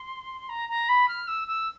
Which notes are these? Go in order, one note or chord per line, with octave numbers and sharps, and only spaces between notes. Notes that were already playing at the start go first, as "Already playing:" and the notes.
Already playing: C6
A#5
A#5
B5
F6
E6
E6